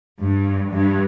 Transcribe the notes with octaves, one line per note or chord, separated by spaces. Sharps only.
G2
G2